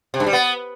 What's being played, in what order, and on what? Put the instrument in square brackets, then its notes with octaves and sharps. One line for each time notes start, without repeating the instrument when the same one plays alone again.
[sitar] C3
G2
G3
B3